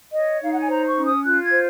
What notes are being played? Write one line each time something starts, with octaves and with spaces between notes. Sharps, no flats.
C#5 D#5
D#4 F5
F#5
G#5
C5 A#5
C#6
C#4
D#6
F4 F#6
G#6
C5